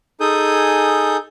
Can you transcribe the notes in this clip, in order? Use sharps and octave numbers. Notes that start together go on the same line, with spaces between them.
D#4 G#4 A4 G#5 D#6 G6